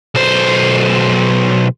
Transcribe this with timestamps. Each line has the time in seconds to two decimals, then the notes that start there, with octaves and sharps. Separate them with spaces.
0.15 B1 C5